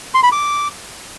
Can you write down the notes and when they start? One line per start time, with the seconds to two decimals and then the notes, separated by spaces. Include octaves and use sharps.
0.14 C6
0.23 B5
0.32 D6